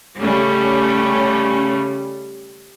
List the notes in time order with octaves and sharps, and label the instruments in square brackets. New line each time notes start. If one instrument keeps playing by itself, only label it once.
[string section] C#3 G3 A3 C#4